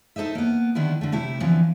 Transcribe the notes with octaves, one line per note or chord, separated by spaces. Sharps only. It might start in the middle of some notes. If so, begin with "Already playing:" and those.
D#4 A4 C5 D#5 E5
A#3 B3
D3 D#3 G3 B3 E4
D3 A3
C3 A3 E4 G4
D3 E3 F3 B3 C4